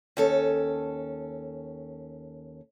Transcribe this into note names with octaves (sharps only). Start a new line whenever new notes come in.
D#2 C#4 A4